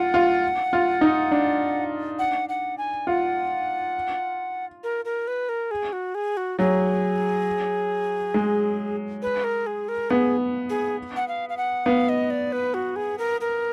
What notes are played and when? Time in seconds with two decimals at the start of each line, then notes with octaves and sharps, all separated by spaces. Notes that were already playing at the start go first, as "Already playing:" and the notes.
Already playing: F4 F#5
0.14 F4
0.73 F4
1.01 D#4
1.31 D4
2.19 F#5
2.49 F#5
2.78 G#5
3.07 F4 F#5
4.83 A#4
5.05 A#4
5.27 B4
5.49 A#4
5.71 G#4
5.92 F#4
6.15 G#4
6.37 F#4
6.59 F#3 G#4
8.34 G#3
9.22 B4
9.44 A#4
9.66 G#4
9.88 A#4
10.10 B3 G#4
10.70 G#4
11.16 F#5
11.28 F5
11.49 F5
11.57 F#5
11.86 B3 F5
12.09 D#5
12.30 D5
12.52 B4
12.74 F#4
12.96 G#4
13.18 A#4
13.41 A#4